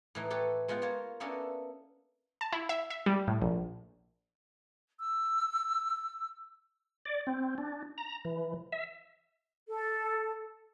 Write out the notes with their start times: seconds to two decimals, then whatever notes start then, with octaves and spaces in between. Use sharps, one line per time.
0.15 A2 E3 D#4
0.30 G4 A4 B4 C#5
0.68 G#3 B3 F4 F#5 G5
0.82 A#3 F4 A#4 C#5
1.20 A#3 B3 C#4 D4 E4 A4
2.41 A5
2.53 E4
2.69 E5
2.90 E5
3.06 G3
3.28 A2
3.41 A#1
5.00 E6
7.05 D5
7.27 C4
7.58 D4
7.98 A#5
8.25 E3
8.72 E5
9.68 A4